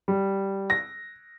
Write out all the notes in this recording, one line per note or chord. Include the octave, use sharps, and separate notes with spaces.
G3
A#6